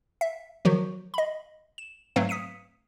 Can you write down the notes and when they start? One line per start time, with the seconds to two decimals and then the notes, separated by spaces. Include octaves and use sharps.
0.21 E5
0.65 D#3 F3 F#3 F#4
1.14 D#5 B5
1.78 E7
2.16 G#2 F#3 A3 C4 B4 F5
2.29 D#6 B6 C#7 D#7